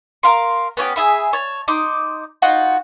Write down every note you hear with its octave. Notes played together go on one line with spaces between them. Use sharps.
A#4 F5 C6
B3 C#4 F#4 G4
G#4 E5 B5
C#5 A5
D#4 C6 D6 D#6
D#4 F4 F#4 F#5